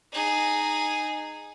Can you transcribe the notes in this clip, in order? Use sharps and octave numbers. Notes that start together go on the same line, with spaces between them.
D#4 G#4